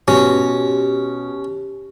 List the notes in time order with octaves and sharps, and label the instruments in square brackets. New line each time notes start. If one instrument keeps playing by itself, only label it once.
[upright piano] B2 [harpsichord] C#4 [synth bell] G4